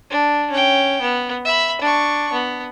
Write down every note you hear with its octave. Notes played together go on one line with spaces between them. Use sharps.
D4
C#4 G5
B3
E5 B5
D4 C#6
B3